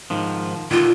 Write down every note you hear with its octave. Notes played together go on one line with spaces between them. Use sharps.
G#2 D#3 F3
A#2 D3 D#3 F4